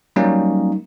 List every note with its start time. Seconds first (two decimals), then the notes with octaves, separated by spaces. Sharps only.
0.16 F#3 G3 A#3 C#4 D#4